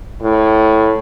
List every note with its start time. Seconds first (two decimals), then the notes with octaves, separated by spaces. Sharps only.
0.22 A2